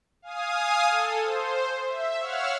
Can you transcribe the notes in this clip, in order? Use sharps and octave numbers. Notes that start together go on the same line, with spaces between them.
F5 G#5 D#6
A4
C5
E5
C#5 F5 F#5 E6 F6